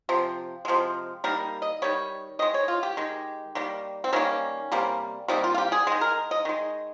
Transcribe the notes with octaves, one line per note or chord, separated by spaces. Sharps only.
C3 F3
C3 F3 G#3
D#3 G3 A#3 A#4
D#5
D#3 G3 C#5
D#3 G#3 D#5
C#5
F4
G4
D#3 G#3
D#3 G3 A#3
C4
D#3 G3 A#3 C#4
C3 G3 A#3
C3 G3 A#3 D#4
F4
F4
G4
G#4
D#3 G#3 G#4
A#4
D#5
D#3 G#3